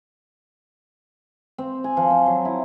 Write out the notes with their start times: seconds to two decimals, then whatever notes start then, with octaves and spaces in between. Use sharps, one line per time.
1.58 C4
1.84 G#5
1.97 F3
2.11 C4
2.26 F#3
2.45 E4